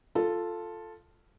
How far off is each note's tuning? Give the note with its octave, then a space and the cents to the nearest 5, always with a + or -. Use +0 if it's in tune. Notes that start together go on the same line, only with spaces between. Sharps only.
F4 +0 A4 +0